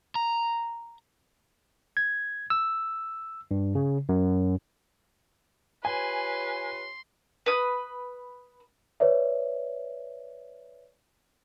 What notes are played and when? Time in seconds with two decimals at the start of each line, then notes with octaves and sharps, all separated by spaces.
0.15 A#5
1.97 G#6
2.50 E6
3.51 G2
3.75 C#3
4.09 F#2
5.85 F4 G4 B4 C#5 G#5 C6
7.46 B4 D#6
9.00 B4 C#5 D5 E5